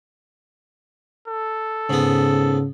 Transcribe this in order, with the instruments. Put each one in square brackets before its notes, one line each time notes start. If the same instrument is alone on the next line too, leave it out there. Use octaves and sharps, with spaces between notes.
[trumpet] A4
[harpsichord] G#2 B3 [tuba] C#3